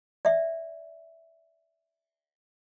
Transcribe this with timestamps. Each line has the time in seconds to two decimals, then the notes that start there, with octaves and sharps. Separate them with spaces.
0.25 D5 E5